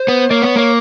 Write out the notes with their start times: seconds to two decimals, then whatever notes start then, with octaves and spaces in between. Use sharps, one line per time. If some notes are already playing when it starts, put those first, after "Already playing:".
Already playing: C5
0.08 B3
0.30 A#3 C#5
0.42 B3 C#5
0.56 A#3 C#5